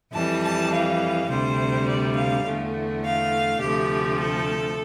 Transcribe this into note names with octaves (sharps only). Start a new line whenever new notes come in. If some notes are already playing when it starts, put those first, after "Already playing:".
F2 E3 G3 A5
A5
F5
D2 C3 G3 C5
D5
F5
E2 D3 A3
F5
D2 C3 F3 A3 G4
A4